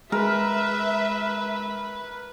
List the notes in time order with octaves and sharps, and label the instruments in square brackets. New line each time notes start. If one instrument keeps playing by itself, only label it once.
[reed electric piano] G#3 [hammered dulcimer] A#4 [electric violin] B4 [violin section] E5